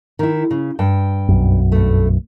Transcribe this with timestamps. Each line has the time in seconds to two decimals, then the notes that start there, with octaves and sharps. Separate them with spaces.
0.19 D#3 E4
0.51 C#3
0.79 G2 G5
1.29 B1 F#2
1.72 G2 A3